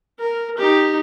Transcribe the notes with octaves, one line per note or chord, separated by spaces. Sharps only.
A#4
D#4 G4